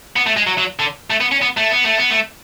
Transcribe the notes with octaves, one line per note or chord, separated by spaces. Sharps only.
B3
A3
G#3
F#3
F#3
D3
A3
B3
C#4
B3
A3
B3
A3
B3
A3